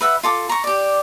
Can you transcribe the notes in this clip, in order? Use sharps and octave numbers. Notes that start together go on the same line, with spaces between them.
B4 E5 F#5
F4 A4 D6
A#5 C#6
G4 D5